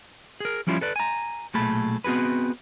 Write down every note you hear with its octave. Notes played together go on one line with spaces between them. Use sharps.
G#4 A#4
F3 G3 C#4 E4 F4 C#5
A4 B4 D5
G#5 A#5
B1 A#2 A3 G#4 A4 B5
B3 C4 F#4 G#4 B4